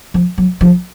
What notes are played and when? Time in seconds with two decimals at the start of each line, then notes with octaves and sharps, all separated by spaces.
0.14 F3
0.38 F#3
0.61 F3